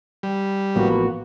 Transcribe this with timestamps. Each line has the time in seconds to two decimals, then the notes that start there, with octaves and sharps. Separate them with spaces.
0.23 G3
0.76 A1 A2 F3 A#3 B3 F#4